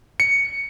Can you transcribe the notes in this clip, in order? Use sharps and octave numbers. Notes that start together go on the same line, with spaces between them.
C#7